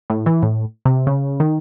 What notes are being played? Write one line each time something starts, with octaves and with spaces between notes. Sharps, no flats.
A2
E3
A2
C3
C#3
D#3